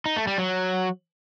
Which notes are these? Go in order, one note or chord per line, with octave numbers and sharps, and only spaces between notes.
D#4
A3
G3
F#3